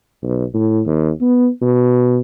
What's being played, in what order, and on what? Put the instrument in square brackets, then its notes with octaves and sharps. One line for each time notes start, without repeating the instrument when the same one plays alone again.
[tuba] B1
A2
D#2
B3
B2